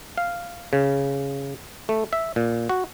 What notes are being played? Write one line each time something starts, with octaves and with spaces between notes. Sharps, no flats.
F5
C#3
A3
E5
A#2
F#4